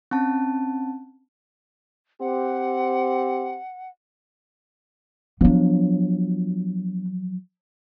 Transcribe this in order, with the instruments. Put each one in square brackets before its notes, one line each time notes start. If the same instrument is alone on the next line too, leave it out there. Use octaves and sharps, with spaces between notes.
[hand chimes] C4 C#4 A5
[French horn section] C4 G4 [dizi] F#5
[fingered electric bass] F3 F#3 [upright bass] B3 D4